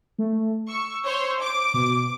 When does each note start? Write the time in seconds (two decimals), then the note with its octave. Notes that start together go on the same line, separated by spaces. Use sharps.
0.19 A3
0.68 C#6 E6
1.05 C5 C#5
1.41 D6
1.74 B2